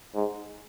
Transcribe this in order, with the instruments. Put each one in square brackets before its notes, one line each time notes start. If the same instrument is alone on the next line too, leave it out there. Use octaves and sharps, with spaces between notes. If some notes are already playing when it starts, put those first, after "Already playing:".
[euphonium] G#2